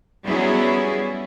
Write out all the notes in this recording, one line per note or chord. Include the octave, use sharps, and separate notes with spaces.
F#3 G3 B3 C#4 E4 G#4